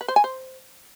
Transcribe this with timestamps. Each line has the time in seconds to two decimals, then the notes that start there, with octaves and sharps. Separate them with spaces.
0.01 B4
0.08 C5
0.16 G#5
0.24 C5